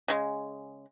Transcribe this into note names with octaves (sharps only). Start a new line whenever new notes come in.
C#3 G#3